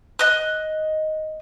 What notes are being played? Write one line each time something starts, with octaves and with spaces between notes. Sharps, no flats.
D#5 F#6